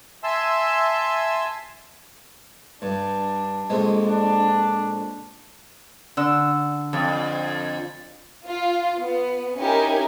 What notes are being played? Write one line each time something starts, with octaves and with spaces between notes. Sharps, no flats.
E5 G#5 A5 C6 E6
G2 D4
A#1 F2 G#3
D4
D3 E6
F2
F4
B3
C#4 D#4 E4 G4 A#4 G#5